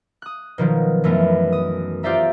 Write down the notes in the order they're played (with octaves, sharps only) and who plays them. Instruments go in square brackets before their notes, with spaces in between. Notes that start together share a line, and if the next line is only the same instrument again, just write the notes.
[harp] D#6 F#6
B2 D#3 F3 F#3
F#2 E3 A3 B3
D#6
F4 G4 C5 D5 E5 A#5